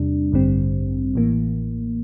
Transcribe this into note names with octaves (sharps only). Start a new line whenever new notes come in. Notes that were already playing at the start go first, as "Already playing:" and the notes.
Already playing: E2 C3 G3 D4
A1 G2 D3 G3 C4
A1 A2 E3 A#3